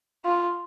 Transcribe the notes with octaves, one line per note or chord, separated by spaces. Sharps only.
F4